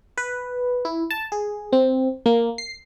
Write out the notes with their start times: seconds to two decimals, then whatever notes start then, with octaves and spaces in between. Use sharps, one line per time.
0.18 B4
0.85 E4
1.10 A5
1.32 G#4
1.73 C4
2.26 A#3
2.58 C7